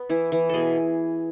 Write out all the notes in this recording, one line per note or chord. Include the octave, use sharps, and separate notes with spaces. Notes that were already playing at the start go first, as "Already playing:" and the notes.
Already playing: B3
E3 E4
E3
B2 G#4 A4